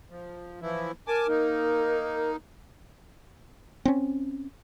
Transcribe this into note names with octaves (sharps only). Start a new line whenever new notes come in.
F3
E3 F3 E4
A#4 G#5 A5 D6
A#3 D#4
C4 C#4